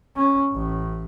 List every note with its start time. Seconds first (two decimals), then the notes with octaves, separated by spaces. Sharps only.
0.16 C#4
0.52 A1 A2